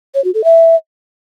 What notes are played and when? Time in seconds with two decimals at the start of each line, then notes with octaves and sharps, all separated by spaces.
0.15 C#5
0.24 F#4
0.34 A4
0.44 E5